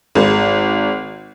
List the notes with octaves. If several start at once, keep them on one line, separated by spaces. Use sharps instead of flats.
G#1 G#3